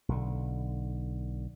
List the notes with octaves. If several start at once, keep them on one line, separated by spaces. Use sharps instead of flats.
B1 D3